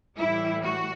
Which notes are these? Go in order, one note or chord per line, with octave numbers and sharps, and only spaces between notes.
A2 E3 G3 E4
F#4